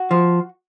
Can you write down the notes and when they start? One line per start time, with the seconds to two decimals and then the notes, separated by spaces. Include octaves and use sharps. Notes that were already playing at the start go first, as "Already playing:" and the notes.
Already playing: F#4
0.11 F3